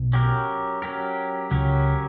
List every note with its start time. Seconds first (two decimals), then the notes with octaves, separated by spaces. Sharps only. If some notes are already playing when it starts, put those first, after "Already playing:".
Already playing: B1 B2
0.13 F#3 C#4 G4 A#4
0.82 F#3 C#4 G4 A#4
1.51 C#2 C#3 F#3 C#4 G4 A#4